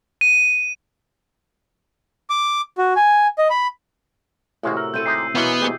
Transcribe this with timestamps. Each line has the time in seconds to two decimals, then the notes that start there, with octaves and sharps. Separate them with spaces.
0.21 D#7
2.30 D6
2.78 F#4
2.96 G#5
3.38 D#5
3.50 B5
4.63 A1 A2 C3 G#3 F#4 F5
4.77 A#4 E6
4.94 C4 E4 A4 G6 D#7
5.06 G#3 D#4 G4 C7
5.35 B2 E3 A#3 B3 C#4 C5
5.61 C2 G#2 G4 G#4